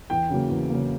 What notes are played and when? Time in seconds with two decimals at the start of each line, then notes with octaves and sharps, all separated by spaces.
0.10 E2 G5
0.30 C#3 F#3 A#3
0.50 E2
0.70 C#3 F#3 A#3